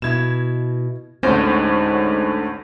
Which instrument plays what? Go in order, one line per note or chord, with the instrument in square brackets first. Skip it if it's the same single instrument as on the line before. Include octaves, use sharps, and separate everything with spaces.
[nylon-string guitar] B2 E4 [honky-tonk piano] G#6 E7
[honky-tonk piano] A1 C#4 [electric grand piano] D2 D3 [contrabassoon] G#2 [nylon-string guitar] C5